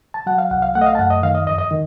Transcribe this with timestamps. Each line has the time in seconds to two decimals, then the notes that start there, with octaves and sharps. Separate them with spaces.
0.14 A5
0.26 F#3 F#5
0.38 F5
0.51 C2 F#5
0.62 F5
0.75 A3 F#5
0.81 D#5
0.86 F5
0.95 A5
0.99 F#2 F#5
1.10 D#5
1.23 D#3 F5
1.35 D#5
1.47 F2 D#5
1.58 D#5
1.71 D#3